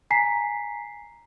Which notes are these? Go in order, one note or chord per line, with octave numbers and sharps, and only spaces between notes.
G#5 A#5 B6 C7